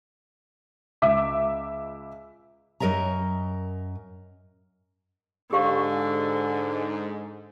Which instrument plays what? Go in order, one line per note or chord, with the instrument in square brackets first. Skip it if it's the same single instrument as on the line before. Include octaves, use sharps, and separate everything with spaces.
[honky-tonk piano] C#2 E5 D6
[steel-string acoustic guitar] F#2 A#4 D#5 E5 A#5
[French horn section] G#2 [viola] D3 [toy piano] G4 F5 C#6